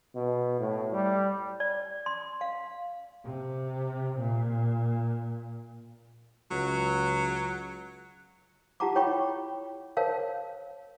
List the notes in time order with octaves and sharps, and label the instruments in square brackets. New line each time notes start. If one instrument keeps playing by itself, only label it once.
[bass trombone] B2
A2
G3
[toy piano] D5
C6
F5
[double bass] C3
A#2
[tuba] C#2 [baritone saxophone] F#3
[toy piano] F4 G4 F#5 A5 A#5 D6
E4 C#5 G5 B5 C#6 D6
A#4 C5 C#5 F5 A5